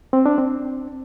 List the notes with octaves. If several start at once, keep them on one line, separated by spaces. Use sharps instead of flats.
C4
D4
C4